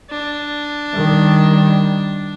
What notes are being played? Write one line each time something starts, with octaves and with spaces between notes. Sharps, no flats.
D4
D#3 G3